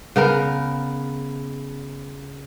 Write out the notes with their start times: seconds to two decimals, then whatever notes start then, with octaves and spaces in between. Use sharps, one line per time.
0.16 C#3 B3 A#4